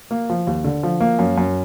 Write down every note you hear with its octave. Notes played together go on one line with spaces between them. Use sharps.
A#3
F3
D#2
D3
F3
A#3
F#2
F#2